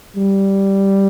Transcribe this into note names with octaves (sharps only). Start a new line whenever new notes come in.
G3